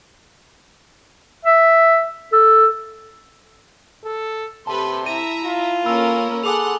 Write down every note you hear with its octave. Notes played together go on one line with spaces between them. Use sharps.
E5
A4
A4
C3 G4 A4 B4 A5 C6
E4 E5 A#5 D#7
F4
A#3 C#4 A4 A#4 B5 E6
G#4 A4 F#5 G#5 C6 D6 F#6 F7